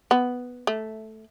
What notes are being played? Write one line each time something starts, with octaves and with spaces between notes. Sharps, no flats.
B3
A3